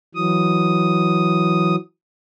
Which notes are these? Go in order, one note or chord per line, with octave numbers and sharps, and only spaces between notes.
E3 F#3 D#6